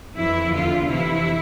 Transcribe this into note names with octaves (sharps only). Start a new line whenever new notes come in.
F2 E3 E4
E2 D3 F4
F2 C3 E3 E4